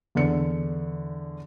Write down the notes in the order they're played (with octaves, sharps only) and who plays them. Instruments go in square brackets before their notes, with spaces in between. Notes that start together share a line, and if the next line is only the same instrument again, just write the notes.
[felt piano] E2 D3 C#7